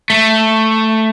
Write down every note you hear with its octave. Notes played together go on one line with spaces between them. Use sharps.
A3